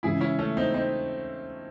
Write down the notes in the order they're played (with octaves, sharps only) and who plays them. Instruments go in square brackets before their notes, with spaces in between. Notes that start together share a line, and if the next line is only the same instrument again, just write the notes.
[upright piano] C#3 E3 G#3 [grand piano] E4 G#4
[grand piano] C#4 E4
A3 C#4
C4 D#4
C4 D#4